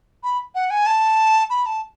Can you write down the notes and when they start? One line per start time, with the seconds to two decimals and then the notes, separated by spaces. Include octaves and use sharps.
0.23 B5
0.55 F#5
0.70 G#5
0.87 A5
1.50 B5
1.66 A5